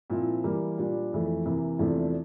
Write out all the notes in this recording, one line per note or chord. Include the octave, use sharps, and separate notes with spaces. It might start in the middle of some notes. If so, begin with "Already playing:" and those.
A#2 F3 C4 E4
E3 G3 A#3
A#2 G3 D4
F2 E3 A3
C3 E3 A#3
E2 C3 F3 A3 D4